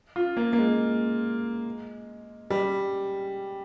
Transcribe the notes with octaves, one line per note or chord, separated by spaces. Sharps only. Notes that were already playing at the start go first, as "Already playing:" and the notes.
F4
A#3
A#3
G#3
G3